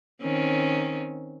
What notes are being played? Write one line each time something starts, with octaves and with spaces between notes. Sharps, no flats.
D#3 C4 C#4